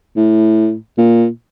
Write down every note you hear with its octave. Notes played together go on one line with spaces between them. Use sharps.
A2
A#2